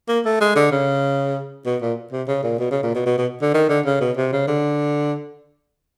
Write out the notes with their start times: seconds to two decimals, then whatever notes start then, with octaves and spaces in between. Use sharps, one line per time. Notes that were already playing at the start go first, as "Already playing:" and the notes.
0.08 A#3
0.25 A3
0.41 G#3
0.56 D3
0.72 C#3
1.66 B2
1.82 A#2
2.12 C3
2.28 C#3
2.43 A#2
2.60 B2
2.71 C#3
2.83 A#2
2.95 B2
3.06 B2
3.18 B2
3.42 D3
3.54 D#3
3.69 D3
3.86 C#3
4.01 B2
4.17 C3
4.33 C#3
4.48 D3